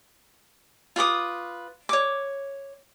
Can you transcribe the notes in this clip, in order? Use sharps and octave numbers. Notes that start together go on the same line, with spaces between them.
F4 B4 D6 D#6
C#5 D6